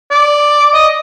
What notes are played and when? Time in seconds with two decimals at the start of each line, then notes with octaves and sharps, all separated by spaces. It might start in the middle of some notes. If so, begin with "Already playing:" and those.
0.11 D5
0.74 D#5